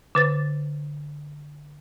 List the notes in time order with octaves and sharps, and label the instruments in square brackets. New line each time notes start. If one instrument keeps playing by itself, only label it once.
[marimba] D3 B4 A6